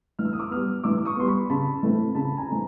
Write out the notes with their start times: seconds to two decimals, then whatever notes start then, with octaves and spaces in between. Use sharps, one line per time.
0.19 E3 F6
0.25 E6
0.33 D#6
0.39 D6 E6
0.51 G3 B3 D#6 F6
0.84 E3 D6 E6
1.05 C#6 D#6
1.16 G3 B3 C6
1.28 B5 C#6
1.50 C#3 A5 B5
1.83 E3 A3 C4
2.15 C#3 A5 B5
2.37 G#5 A#5
2.48 E3 A3 C4